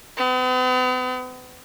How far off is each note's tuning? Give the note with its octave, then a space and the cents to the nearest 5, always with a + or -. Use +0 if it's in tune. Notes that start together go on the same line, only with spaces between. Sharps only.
B3 +45